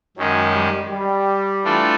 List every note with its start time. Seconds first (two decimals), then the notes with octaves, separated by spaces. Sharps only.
0.17 F#2 D#3 F#3 G#3 C#4
0.54 G3
0.91 G3
1.64 E3 A3 D4 F4 A4